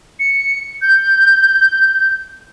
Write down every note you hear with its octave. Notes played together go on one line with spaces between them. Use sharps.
C#7
G6